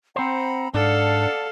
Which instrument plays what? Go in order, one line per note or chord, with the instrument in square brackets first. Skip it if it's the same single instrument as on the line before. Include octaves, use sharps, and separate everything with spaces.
[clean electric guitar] C4 C5 [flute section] F#5 A#5 B5
[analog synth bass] G#2 [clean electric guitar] D4 [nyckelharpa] A4 F5 [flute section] D5 F#5 A5